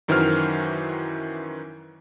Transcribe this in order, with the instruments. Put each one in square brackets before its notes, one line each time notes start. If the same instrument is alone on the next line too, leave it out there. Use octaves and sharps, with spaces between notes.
[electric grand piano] F#2 D#3 E3 F#4 C5 F6